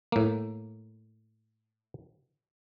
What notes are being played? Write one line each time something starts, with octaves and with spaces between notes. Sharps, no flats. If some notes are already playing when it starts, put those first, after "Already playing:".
A2 A#3